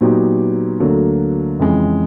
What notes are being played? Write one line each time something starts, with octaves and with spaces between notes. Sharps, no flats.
A#2 F#3 B3 D#4 G4
D2 D3 F#3 A#3
F2 C#3 E3 G#3